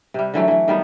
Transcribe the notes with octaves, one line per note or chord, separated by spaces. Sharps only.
C3 G3
D3 E3 F#3 A3
E3 F#3
D#3 G3 B3